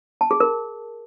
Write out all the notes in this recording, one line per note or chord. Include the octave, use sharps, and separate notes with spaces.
A5
G#4
A#4